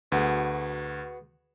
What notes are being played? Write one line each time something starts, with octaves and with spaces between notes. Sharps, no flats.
D2 B3 F#4 G#4